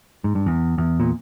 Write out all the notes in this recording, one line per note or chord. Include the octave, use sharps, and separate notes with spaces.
G#2
G2
E2
E2
A#2